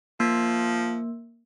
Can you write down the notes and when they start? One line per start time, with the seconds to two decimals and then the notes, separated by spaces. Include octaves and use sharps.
0.20 F3 A#3